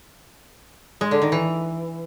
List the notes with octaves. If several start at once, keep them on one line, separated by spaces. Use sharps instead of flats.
G#3
D3
D#3
E3